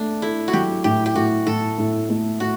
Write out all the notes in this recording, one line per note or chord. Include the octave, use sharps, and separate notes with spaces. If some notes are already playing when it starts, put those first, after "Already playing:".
Already playing: A3 D4 A4
E4 A4
F#4
F#3 G4
A2 G4
G4
A2 F#4
A2 A4
A2
A3
A2 F#4